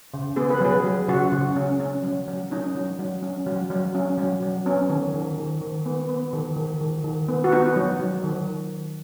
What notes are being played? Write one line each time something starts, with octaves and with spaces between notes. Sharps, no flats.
C#3
B3 G#4
B4
F#3 G#4
F#3
C#3 F#4
C#3
C#4
C#4
F#3
F#3
C#4 D#4
F#3
F#3
C#4
F#3
F#3
C#4
F#3
F#3
B3 C#4
D#3
D#3
D#3
D#3
B3
B3
D#3
D#3
D#3
D#3
B3
F#4
B3 D#4
F#3
F#3
D#3